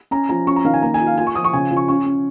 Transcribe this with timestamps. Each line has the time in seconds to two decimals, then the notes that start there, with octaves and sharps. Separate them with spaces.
0.11 C#4 A#5
0.29 F3 A#5
0.47 C#4 C#6
0.56 A#5
0.65 D#3 F5
0.74 G#5
0.82 A#3 A#5
0.94 G#5
1.00 F4
1.07 F5
1.17 F4 G#5
1.27 C#6
1.35 F3 D#6
1.44 C#6
1.53 C#3 G#5
1.71 F3
1.77 C#6
1.88 C#4 C#6
2.06 C#4